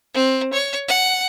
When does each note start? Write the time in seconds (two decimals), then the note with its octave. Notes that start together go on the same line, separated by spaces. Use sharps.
0.14 C4
0.53 C#5
0.88 F#5